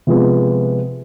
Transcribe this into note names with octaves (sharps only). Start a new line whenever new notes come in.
C3 F3 G#3 B3